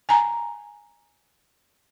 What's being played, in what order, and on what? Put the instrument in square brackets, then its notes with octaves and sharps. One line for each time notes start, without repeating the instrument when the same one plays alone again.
[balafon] G#5 A#5